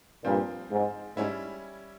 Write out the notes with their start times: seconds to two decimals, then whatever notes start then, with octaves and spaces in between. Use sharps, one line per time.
0.24 G2 A#2 F3 C4 F4
0.71 G#2
1.16 G#2 G3 C#4 E4